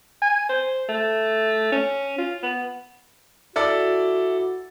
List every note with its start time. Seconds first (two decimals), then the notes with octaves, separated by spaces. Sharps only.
0.22 G#5
0.49 C5
0.89 A3
1.72 C#4
2.18 F4
2.43 B3
3.56 E4 F#4 A4 D5